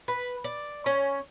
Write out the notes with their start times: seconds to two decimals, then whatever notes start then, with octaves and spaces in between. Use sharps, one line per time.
0.08 B4
0.44 D5
0.86 C#4